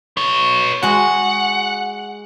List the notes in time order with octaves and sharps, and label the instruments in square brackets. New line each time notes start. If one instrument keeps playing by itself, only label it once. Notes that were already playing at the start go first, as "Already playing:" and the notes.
[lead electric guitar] B4 C#5
[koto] G#3 F#4 [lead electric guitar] F#5